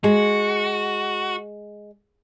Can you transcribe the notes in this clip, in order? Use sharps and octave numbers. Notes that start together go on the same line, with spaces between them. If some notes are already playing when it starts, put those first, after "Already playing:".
G#3 F#4